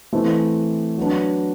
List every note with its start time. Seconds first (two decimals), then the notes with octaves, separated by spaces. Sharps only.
0.13 E3 A3 C4
0.98 F#3 B3 D4